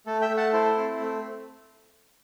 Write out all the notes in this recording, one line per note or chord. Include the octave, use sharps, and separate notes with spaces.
A3 A4
E5 G5
A3
F#5 A5
E4 A4 C5
C4
A3